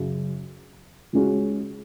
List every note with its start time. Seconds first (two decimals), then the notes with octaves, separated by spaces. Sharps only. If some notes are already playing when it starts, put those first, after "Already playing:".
Already playing: F#2 C#3 F#3
1.13 C#2 C#3 G#3 C#4 F#4